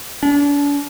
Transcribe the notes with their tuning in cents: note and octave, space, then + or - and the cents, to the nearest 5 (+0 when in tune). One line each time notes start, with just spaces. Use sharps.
D4 -40